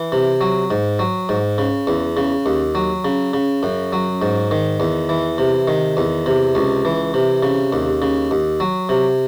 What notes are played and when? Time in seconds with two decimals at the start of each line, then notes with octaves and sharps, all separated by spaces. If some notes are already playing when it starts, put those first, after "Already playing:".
Already playing: E3
0.12 C3
0.41 F#3
0.71 G#2
0.99 F#3
1.29 G#2
1.58 C#3
1.87 E2
2.17 C#3
2.46 D#2
2.75 F#3
3.05 C#3
3.33 C#3
3.63 F#2
3.93 F#3
4.22 G#2
4.51 D#3
4.80 E2
5.09 E3
5.38 C3
5.68 D#3
5.97 E2
6.26 C3
6.55 C#2
6.85 E3
7.14 C3
7.43 C#3
7.73 D#2
8.02 C#3
8.31 D#2
8.60 F#3
8.89 C3